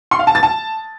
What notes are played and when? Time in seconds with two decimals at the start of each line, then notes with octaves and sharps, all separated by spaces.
0.11 C6
0.19 F5
0.27 A5
0.35 A6
0.43 A5